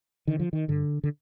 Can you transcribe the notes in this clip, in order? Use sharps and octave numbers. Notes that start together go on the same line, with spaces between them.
D3 D#3
F3
D#3
G2 D3
D3